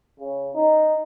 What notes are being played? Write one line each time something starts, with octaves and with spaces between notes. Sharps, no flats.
C#3
D#4